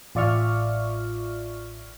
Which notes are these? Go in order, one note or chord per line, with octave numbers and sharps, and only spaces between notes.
A1 F4 D5 E5 C#6 F6